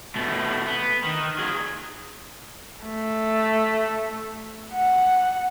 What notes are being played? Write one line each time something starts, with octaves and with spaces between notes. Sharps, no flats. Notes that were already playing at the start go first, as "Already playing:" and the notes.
B2 A3
B3
D#3
F#3 G#4
A3
F#5